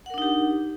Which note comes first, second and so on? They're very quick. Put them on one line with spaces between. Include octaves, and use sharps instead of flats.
F#5 A#4 D4 D#4 G4